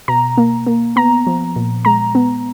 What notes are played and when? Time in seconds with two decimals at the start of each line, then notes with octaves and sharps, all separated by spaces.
0.08 B2 A#5
0.37 A#3
0.67 A#3
0.96 B3 A#5
1.27 F3
1.56 A#2
1.85 G#3 A#5
2.15 B3